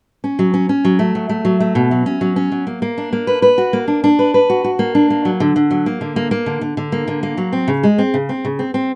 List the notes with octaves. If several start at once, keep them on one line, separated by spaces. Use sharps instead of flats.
C#4
F#3
C#4
C#4
F#3
A3
F#3
A3
F#3
A3
B2
F#3
C#4
F#3
C#4
F#3
A#3
A#3
D4
A#3
B4
B4
F#4
A#3
D4
D4
B4
B4
F#4
F#4
A#3
D4
A#3
F#3
D3
D3
F#3
A#3
D3
A#3
A#3
D3
D3
D3
A#3
D3
A#3
F#3
C4
C#3
G#3
C4
C#3
C4
C#3
C4
C4